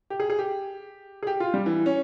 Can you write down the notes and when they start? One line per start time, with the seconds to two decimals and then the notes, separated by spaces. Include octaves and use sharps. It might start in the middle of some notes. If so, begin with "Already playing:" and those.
0.10 G4
0.20 G#4
0.30 G#4
0.39 G4
1.23 G#4
1.27 G4
1.40 F4
1.54 G3
1.66 E3
1.86 C#4